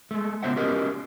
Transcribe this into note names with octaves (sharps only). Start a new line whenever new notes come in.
G#3 A3
C#3 B3 C5 E5 F#5
C#4 F#4 G4 A#4 B4 D#5